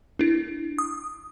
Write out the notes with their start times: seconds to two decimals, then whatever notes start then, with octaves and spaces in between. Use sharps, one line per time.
0.19 D4 E4
0.78 D#6